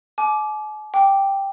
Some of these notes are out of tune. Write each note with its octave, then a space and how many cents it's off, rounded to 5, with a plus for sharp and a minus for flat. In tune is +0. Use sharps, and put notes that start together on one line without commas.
G#5 +45 D6 +0
G5 +0 D6 +0